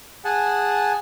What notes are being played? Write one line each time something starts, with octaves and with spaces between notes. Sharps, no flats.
G#4 F#5 G#5 A5